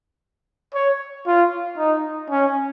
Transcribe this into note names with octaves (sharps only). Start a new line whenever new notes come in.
C#5
F4
D#4
C#4